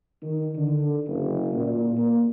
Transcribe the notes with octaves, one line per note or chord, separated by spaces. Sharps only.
D#3
D3
F#1
A#2
A#3